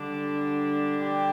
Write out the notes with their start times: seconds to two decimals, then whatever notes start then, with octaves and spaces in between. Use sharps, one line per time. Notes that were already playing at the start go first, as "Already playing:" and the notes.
Already playing: D3 G3 D4
1.00 G4